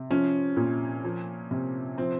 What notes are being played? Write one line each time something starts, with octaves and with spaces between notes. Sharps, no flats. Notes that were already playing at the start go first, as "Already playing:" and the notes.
Already playing: C3
F3 C#4
A#2
F3
C3
F3 C4